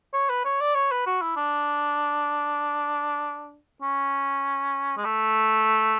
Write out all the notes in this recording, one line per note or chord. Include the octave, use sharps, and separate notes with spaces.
C#5
B4
C#5
D5
C#5
B4
F#4
E4
D4
C#4
G#3
A3